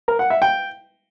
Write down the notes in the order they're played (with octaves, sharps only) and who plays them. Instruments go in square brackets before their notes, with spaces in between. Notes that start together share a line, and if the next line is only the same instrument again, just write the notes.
[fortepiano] A#4
F#5
E5
G5